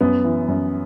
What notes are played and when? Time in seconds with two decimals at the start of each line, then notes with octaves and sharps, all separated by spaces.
0.01 F#2 B3
0.24 E3
0.48 F#2